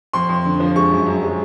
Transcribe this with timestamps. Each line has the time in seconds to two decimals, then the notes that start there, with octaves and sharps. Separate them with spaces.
0.13 F2 C6
0.29 F2
0.45 D3
0.60 F3
0.76 G#3 C#6
0.92 F#2
1.07 F#2
1.23 G#3